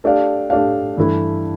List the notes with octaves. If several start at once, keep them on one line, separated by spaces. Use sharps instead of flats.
A3 D4 G4 D5 F5
A3 D4 G4 D5 F5
G2 E3 A3 E4